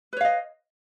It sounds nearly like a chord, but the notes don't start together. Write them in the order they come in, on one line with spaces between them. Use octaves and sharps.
B4 C#5 F5 D#5